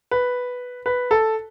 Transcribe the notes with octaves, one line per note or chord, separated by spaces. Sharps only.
B4
B4
A4